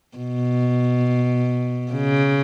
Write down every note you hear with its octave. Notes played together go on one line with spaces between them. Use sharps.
B2
C#3